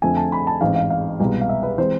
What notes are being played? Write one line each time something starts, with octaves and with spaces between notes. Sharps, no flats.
F2 D3 A3 C4 G#5
A5
B5
A5
A1 G#2 G#3 C4 F5
F5
F5
C2 B2 G#3 B3
F5
E5
B4
E3 G#3 C4 C5